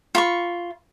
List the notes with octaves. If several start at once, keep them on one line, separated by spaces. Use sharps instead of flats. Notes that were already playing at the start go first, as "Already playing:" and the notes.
F4 B5 C#6